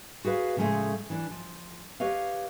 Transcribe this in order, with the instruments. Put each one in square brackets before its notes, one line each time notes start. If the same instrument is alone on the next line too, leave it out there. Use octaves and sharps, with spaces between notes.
[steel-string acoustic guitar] F#4 G#4 B4 F5
A2 C#3 F3 F#3 G#3 A3
E3 D4
F3
G4 B4 C#5 D#5 F5